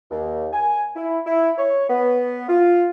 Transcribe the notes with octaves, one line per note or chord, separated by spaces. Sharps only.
D#2
G#5
E4
E4
C#5
B3
F4